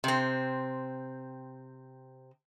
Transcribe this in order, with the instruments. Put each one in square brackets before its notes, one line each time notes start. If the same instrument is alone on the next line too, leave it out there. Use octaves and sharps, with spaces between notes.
[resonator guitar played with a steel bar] C3 C4